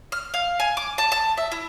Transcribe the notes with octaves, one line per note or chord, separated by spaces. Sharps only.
F6
F5
G#5
D6
A5
A5
E5
E4